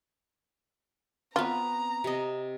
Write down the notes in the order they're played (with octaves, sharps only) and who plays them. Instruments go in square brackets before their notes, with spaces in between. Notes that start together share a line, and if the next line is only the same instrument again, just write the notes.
[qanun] B3 C4 B4 [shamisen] F4 [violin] A#5
[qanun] C3 D#5